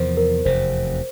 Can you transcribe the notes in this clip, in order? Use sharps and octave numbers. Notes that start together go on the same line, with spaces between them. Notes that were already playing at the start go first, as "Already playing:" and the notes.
Already playing: E2 C3 F3 A#4 C5
A#4
F1 E2 C3 C5